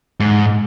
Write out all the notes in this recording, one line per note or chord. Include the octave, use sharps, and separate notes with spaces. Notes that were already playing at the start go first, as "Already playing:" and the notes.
G#2